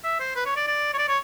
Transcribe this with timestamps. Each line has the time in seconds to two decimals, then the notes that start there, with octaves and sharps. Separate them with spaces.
0.04 E5
0.20 C5
0.35 B4
0.46 C#5
0.56 D5
0.67 D5
0.94 C#5
0.98 D5
1.08 C#5